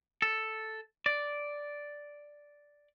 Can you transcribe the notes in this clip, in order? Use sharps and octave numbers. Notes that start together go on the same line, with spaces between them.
A4
D5